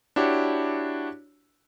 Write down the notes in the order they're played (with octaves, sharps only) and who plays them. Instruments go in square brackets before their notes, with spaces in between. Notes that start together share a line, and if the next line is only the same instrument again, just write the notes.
[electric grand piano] D4 E4 F#4 G4 C#5